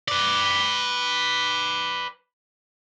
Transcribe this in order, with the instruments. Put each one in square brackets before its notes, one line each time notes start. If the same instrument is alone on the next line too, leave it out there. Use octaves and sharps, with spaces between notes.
[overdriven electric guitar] B4 D5